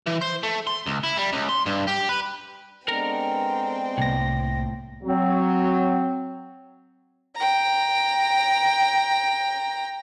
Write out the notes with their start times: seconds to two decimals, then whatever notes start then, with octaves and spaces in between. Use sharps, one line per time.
0.07 E3
0.22 C5
0.43 A3
0.67 C6
0.86 C#2
1.04 E4
1.17 G3
1.33 C#2
1.49 C6
1.66 G2
1.87 G4
2.09 B4
2.88 G#3 B3 C4 D4 A4 A#4 G5 A#5
3.98 C2 A2 A#3 A#6
5.03 F#3 C4
7.35 G5 A#5